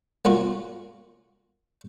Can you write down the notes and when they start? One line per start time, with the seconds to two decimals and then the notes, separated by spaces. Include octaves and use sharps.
0.25 A#3 C#4 F4 F#4